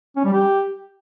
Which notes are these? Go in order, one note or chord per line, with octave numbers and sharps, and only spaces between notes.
C#4
G3
G4